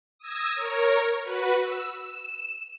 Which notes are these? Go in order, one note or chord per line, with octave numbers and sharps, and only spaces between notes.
D#6 E6 G#6 A#6
A#4 C#5
F#4 B4
E6
E7